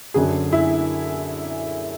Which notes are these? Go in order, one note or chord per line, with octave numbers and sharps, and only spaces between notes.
F#2 D3 F#3 G#4
E4